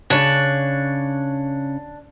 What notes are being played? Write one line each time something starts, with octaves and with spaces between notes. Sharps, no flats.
C#3 D4 C#5